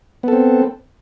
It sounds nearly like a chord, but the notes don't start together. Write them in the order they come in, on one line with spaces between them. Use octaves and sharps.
B3 A4 C4